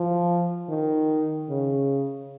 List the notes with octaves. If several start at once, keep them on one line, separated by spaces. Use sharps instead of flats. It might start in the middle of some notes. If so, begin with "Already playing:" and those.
Already playing: F3
D#3
C#3